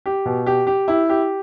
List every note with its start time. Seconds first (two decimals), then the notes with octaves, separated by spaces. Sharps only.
0.06 G4
0.26 B2
0.46 G4
0.67 G4
0.88 E4
1.09 G4